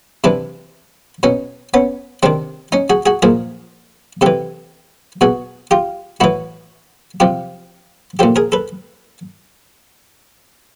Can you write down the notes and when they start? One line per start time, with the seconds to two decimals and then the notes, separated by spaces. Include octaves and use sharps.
0.24 C3 E3 D4 E4
1.23 B2 C#4 D#4
1.74 B3 C#4
2.23 C3 D#3 C4 D4
2.72 C#4 D#4
2.90 F#4 G#4
3.06 F#4 G#4
3.22 A#2 F3 G#4 A#4
4.21 C3 E3 G4 A4
5.21 B2 F#4 G#4
5.71 F4 G4
6.20 A2 E3 E4 F#4
7.20 C3 F3 F4 G4
8.19 A#2 F3 G4 A4
8.36 G#4 A#4
8.52 A4 B4